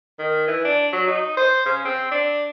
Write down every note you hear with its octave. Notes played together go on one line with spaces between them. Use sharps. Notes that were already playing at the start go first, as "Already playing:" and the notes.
D#3
E3
D4
F#3
D#4
C5
C#3
C4
D4